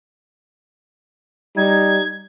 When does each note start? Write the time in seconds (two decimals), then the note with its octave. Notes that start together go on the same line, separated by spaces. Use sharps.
1.57 G3 D#4 G#6